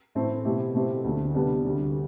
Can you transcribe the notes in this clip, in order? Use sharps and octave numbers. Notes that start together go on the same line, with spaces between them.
A2 E3 A3 C4 E4
B2 A3 E4 G4
B2 A3 C4 E4 G4
D2 D3 A3
C3 G3 B3 D4 G4
D2 D3 G3